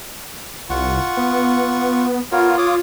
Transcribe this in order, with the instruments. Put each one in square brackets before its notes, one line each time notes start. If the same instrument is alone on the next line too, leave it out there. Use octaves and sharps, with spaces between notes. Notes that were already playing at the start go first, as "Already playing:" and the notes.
[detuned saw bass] C2 [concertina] F4 F#5 C#6
[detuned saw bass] B3
[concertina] B3 A#4 C#5 [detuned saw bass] F4
[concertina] C#5 D6 D#6